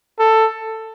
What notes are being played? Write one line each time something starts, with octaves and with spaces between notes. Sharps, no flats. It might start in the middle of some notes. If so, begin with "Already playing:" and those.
A4